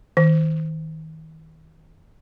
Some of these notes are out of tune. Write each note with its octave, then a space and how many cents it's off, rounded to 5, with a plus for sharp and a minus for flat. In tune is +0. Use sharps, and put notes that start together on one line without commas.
D#3 +35